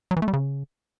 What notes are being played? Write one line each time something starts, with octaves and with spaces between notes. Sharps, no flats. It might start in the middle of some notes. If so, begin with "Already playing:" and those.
F#3
E3
A3
G3
C#3